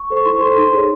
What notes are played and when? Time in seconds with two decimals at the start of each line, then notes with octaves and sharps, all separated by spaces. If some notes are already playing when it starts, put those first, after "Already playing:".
Already playing: C#6
0.10 A4 C5
0.17 C#6
0.25 E4 C6
0.41 A4 C5 C6
0.57 D#4
0.74 G#4 C#5